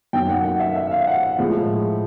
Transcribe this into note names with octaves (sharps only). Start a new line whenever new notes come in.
F#2 D#3 F#3 G5
F#5
F#5
E5
E5
F5
F#5
A2 F3 G#3